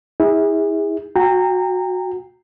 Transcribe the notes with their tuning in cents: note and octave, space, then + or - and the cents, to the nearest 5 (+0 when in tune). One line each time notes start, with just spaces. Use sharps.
E4 -30 G#4 -30
F#4 -10 G5 +30 A#5 -20